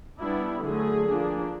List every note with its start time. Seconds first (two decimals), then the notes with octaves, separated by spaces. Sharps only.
0.20 G3 B3 D4 E4
0.62 D3 F#3 A3 G#4
1.06 F3 A#3 D4